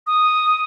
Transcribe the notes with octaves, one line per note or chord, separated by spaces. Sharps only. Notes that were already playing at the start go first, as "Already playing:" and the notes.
D#6